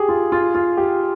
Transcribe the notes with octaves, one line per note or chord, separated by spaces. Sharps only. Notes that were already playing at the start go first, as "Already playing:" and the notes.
Already playing: G4 G#4
F4
F4
F4
G4